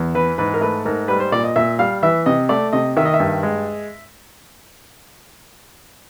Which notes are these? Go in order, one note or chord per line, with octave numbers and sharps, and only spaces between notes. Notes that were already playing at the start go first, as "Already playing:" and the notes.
Already playing: E2
E3 B4
G#2 B4
A#4
A3 B4
G#2 A#4
G3 B4
C5
A#2 D5
D#5
A#2 E5
G3 F5
E3 E5
C3 D#5
A3 D5
C3 D#5
D#3 E5
D#5
E5
G2
G#3